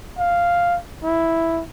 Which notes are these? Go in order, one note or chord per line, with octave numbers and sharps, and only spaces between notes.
F5
E4